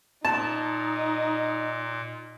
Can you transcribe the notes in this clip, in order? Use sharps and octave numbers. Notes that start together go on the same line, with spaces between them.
A#2 D#4 A5